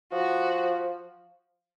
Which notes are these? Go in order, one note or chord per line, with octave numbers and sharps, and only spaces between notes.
F3 F#4